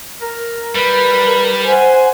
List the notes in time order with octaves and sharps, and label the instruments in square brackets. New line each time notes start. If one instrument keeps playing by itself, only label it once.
[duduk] A#4
[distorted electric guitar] G3 [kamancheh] A#4 [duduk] B4
[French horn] C5 [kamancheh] F#5 G#5